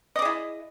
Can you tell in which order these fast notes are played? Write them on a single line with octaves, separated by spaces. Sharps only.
D#5 D5 G#4 E4